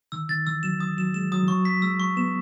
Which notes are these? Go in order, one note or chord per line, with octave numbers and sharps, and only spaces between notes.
D#3 E6
D#3 A6
E3 E6
F#3 E7
D#6
F#3 E7
G#3 E7
F#3 D#6
E3
F#3 C#6
B6
G#3 E6
C#6
B3 E7